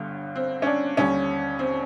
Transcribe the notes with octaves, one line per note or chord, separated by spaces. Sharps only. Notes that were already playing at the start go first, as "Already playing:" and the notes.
Already playing: G1 G2 D3
C4
C#4
D4
D#2 D3 G3 C#4
C4